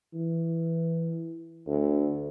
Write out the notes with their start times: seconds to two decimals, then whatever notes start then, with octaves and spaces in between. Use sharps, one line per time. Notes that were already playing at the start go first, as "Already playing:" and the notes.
0.14 E3
1.67 D2